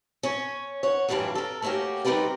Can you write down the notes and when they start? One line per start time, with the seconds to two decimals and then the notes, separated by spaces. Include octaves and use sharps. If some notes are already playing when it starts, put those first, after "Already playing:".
0.23 C#4 C#5
0.83 C#5 F#5
1.09 F#2 A2 E3 G3 D4 F4
1.35 A4 A#4
1.62 A3 A#3 C#4 F#4 G4
2.05 G3 C4 D#4 A#4 B4 D5